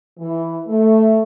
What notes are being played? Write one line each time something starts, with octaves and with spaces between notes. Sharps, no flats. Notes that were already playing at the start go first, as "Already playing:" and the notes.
E3
A3